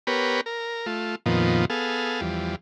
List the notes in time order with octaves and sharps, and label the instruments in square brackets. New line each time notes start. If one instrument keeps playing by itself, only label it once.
[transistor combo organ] B3 G4 A#4 B4 C#5
A#4
A3 F4
F2 A#2 D#3 F3 B3
B3 G#4 A4 F5
E2 F3 G3